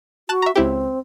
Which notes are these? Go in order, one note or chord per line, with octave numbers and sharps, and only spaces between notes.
F#4 A5 F#6 E7
E5 A#5
C#2 C4 E4 G4